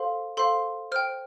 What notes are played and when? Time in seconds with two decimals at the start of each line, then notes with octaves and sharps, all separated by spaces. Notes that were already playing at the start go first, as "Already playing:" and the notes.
Already playing: A4 C5 F5 C6
0.37 A4 C5 F5 C6
0.92 C5 G5 F6